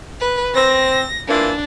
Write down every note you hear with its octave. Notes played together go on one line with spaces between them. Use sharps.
B4
C4 A#6
E3 A#3 D4 F4